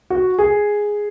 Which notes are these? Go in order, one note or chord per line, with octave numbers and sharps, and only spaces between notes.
F#4
G#4